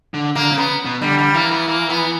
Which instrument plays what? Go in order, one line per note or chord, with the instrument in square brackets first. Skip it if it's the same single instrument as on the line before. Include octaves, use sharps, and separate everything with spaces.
[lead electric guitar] D3
[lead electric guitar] D3 [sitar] A#3
[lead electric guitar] C#3
[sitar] B3
[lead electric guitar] B2
[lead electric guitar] D3 [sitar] G3
[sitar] G3
[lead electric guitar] E3 [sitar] A#3
[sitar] B3
A#3
B3